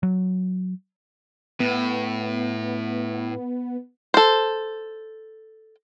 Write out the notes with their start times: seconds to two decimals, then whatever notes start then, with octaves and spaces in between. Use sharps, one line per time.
0.03 F#3
1.60 A2 B3
4.14 A4 C5